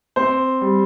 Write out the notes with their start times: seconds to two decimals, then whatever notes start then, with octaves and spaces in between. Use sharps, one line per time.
0.16 C4 C5
0.61 G3